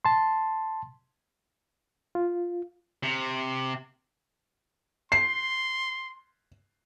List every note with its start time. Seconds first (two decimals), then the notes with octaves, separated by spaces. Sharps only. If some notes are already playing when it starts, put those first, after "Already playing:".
0.05 A5 C6
2.15 F4
3.03 C3
5.12 C6 C7